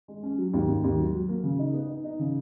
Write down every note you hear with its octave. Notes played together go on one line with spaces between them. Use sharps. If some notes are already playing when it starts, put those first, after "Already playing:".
G#3
C#4
F#3
D#2
D#2
D#2
F#3
F#3
A#3
C#3
D#4
B3
D#4
D#4
C#3